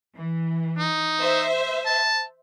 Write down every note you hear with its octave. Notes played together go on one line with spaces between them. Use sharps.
E3
D#4
C5 E5
A5